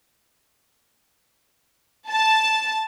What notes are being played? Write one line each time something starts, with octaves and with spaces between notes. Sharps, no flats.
A5